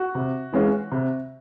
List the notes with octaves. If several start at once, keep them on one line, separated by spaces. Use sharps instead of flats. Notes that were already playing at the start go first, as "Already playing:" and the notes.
Already playing: F#4
C3
E3 G#3 C#4 F4
C3